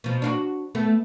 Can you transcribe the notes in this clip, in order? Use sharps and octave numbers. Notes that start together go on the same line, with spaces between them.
B2 F3
D4 F4 F#4
A3 B3